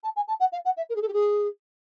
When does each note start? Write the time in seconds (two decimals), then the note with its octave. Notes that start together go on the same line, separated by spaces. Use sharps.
0.03 A5
0.16 G#5
0.28 A5
0.40 F#5
0.52 F5
0.65 F#5
0.77 E5
0.89 A#4
0.96 G#4
1.02 A4
1.08 G4
1.13 G#4